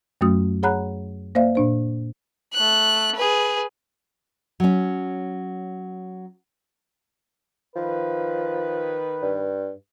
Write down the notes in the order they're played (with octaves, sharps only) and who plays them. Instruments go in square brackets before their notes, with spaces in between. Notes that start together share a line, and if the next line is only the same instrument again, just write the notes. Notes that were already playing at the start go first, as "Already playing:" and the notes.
[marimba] F#2 F#3 A3 C#4 F#4 D#6
G#4 C#5 F#5 A#5 B5 F#6
A#3 C5 D5 E5 F5
A#2 D4 C5
[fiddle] A3 F#6
G#4 B4
[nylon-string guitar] F#3 C#4
[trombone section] D#3 B4 [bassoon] F3
[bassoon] G2